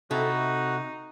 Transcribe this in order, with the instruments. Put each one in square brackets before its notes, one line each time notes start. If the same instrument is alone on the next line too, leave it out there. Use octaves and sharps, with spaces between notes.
[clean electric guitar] C3 [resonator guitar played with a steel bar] C4 E4 A4 [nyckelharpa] D#4 [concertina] F#4